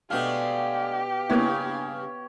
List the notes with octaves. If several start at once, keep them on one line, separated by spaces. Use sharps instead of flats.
B2 G#3 A3 D4 G4 F5
G2 C#3 A#3 B3 E4 C#5